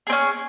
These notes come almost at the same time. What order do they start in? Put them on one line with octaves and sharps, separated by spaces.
G#4 C4 C#4